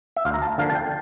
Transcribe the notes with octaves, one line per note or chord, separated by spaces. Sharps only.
E5
D2 F5
A#5
A5
D3 F3 A#3 F5
A5
G5